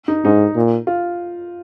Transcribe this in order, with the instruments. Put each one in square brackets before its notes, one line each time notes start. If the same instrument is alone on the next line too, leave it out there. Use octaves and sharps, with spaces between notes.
[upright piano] D#4
[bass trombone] G#2 [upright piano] D#4
[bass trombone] A#2
[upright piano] F4